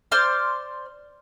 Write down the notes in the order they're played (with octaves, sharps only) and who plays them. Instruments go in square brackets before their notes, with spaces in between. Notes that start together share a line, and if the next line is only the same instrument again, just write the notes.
[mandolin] C5 D5 C6 F6